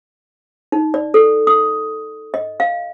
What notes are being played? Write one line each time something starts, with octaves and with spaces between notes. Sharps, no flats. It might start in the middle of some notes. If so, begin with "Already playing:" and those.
D#4
D5
A4
D#6
D#5
F5